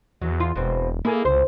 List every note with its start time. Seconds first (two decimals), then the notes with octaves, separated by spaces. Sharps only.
0.22 E2 F#3
0.40 F4
0.56 E1 B2 C4
1.05 A#3 E4 G#4 A4
1.25 C#2 C5